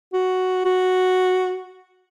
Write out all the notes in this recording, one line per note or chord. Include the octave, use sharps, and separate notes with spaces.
F#4
F#4